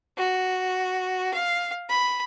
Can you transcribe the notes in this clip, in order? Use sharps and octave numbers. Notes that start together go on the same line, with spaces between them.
F#4
F5
B5